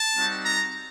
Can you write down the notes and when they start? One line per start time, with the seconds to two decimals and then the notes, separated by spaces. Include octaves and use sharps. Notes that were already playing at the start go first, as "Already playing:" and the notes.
Already playing: A5
0.15 G3 C4 D#4 F#4
0.45 A#5